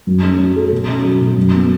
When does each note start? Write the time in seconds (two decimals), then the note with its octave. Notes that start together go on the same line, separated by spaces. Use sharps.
0.07 F#2
0.23 C#4
0.39 F#3
0.56 A4
0.72 B2
0.88 C#4
1.04 F#3
1.21 B2
1.38 F#2
1.54 B3